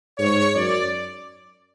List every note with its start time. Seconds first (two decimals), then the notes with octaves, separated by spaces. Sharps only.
0.19 G#2 C#5
0.55 F#2 D5